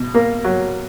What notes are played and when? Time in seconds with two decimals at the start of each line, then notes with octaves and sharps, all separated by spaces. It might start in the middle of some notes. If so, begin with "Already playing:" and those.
Already playing: B2
0.14 A#3
0.44 F#3